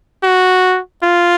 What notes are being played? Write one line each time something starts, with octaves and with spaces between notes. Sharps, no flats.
F#4
F4